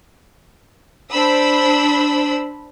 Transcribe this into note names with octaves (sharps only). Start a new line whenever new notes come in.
D4 C5 B5 E6